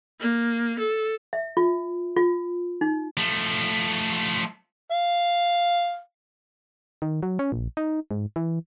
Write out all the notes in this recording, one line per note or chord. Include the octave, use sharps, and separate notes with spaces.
A#3
A4
E5
F4
F4
D#4
F3 A3
F5
D#3
F#3
C#4
A#1
D#4
G#2
E3